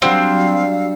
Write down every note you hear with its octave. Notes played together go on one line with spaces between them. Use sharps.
F#3 G3 C4 D4 F#4 G4 F5 E6